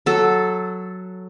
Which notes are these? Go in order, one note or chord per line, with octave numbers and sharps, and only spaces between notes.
F#3 A4